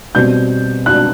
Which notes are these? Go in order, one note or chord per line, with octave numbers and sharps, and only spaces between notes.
B2 G3 C4 G6
F#6